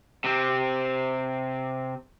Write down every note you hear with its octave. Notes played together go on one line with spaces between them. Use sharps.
C3 C4